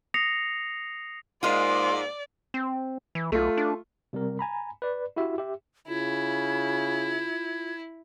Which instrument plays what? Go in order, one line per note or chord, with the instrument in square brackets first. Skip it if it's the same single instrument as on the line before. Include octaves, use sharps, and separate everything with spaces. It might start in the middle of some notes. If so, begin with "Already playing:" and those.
[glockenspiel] D#6 A#6 C7 C#7 F7
[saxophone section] G#2 A#3 [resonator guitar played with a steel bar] G#3 F4 [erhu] D5 [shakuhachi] C6
[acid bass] C4
E3
[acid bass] B1 [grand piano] A3 F4
[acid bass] D4
[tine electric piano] C3 G3 C4 A#4
G#5 A#5 B5
B4 D5
E4 F#4 G4 E5
G4 E5
[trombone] C#3 [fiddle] E4 [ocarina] F4 [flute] G#6